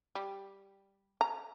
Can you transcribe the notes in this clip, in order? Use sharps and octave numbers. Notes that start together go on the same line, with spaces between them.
G3
A#5